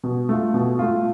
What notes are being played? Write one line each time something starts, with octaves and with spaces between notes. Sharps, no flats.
B2
A3 F4
B2
A3 F4